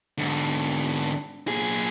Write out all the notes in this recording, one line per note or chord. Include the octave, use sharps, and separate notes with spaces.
G#2 D3
A#2 G#4